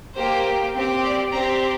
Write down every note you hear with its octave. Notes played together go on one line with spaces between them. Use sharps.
A#3 G4 C5
C4 G4
D5
C4 G4 A#5